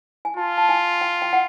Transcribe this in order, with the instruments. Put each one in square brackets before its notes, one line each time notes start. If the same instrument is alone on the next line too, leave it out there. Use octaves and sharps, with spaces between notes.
[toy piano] G#5
[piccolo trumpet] F4 [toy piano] A5
[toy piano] A5
G#5
G5
G5
F#5